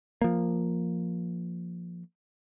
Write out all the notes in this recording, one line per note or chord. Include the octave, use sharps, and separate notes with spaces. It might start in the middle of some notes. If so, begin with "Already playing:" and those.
F3 A#3